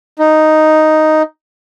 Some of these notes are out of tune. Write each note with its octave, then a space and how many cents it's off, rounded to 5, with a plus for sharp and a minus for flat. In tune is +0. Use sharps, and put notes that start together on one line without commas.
D#4 +0